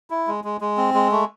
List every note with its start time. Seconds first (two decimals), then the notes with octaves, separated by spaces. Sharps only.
0.10 E4
0.27 G#3
0.44 G#3
0.61 G#3
0.77 C4
0.94 G#3
1.11 A3